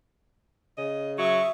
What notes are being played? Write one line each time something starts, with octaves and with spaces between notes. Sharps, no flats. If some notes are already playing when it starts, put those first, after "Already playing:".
C#3 D#5
F#3 E5 C#6 D#6